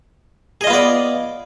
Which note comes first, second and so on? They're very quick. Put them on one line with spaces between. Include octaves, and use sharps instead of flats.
G#4 D#5 F4 B3 D5